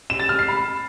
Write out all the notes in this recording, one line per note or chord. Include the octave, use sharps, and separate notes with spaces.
E7
A6
F6
C7
B5